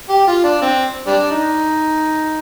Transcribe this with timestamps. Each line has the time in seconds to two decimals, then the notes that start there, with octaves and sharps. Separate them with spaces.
0.09 G4
0.27 F4
0.44 D4
0.62 C4
1.07 G3 D4
1.31 D#4